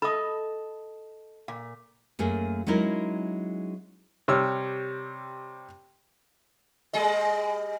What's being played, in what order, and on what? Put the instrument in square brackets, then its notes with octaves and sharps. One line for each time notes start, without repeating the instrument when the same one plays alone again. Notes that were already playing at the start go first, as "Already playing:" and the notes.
[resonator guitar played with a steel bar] A4 D#5 [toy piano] B5 D#6
[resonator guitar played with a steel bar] A#2 [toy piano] F5
[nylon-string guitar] F#2 A3 A#3 G#4
F#3 G#3 C#4 D#4 E4 A#4
[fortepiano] C3 G3 C#5 E6 F6
[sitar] G3 G#4 D#5